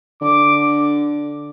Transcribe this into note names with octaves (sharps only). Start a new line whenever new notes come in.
D3 D6